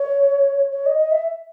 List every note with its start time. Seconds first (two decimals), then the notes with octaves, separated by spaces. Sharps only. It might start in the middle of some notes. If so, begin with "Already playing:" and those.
Already playing: C#5
0.72 C#5
0.86 D#5
0.99 D#5
1.11 E5